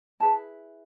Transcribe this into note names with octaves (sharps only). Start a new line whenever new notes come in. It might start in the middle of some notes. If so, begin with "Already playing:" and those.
E4 G#4 B4 A5